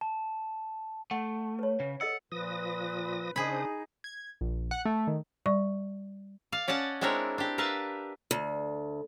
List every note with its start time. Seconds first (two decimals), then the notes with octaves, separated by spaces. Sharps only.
0.01 A5
1.11 A3 F#5
1.59 B4 C#5
1.80 C#3
2.01 A4 D#5 F#5 E6
2.32 A#2 F3 B4 D#6 A#6
3.36 C#3 D4 D#4 G#4 C5 B5 D#6
4.04 G#6
4.41 A#1
4.71 F#5
4.85 A3
5.07 D#3
5.46 G3 D5 C#6
6.52 D5 F5
6.68 C#4 D5 D#5 F#5 A5
7.01 G#3 C4 D4 E4 A#4 C#5
7.38 D4 G4
7.58 A#4 B4 E5 F5 A5
8.31 D2